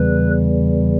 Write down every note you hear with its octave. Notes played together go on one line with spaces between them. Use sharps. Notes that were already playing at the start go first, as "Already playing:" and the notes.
Already playing: E2 C#3 E3 G3 B4